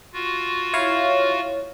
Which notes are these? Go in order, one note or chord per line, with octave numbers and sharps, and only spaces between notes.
F4 F#4
E4 C#5 F5